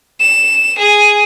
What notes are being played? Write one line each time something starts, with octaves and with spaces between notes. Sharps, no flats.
E7
G#4